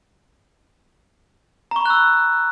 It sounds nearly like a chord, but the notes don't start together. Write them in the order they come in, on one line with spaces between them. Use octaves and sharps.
A#5 C#6 B5 F#6 E6